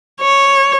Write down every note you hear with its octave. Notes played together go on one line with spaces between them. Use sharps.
C#5